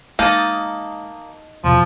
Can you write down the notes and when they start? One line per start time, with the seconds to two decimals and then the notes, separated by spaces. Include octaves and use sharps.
0.19 G#3 A#3 D#4 A5 D#6
1.64 E2 B2 F3